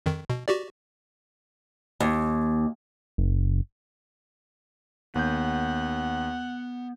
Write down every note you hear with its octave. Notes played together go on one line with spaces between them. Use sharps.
F2 D#3
B2
F#4 G4 D5
D#2
F#1
D#2 B3 F#5 G6